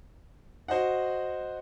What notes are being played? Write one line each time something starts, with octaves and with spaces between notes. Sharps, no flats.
F#4 C5 D#5 F#5